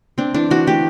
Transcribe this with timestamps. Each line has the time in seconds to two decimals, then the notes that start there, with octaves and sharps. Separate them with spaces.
0.18 C4 D4
0.34 E3 D4
0.50 E3 F#4
0.67 A3 G4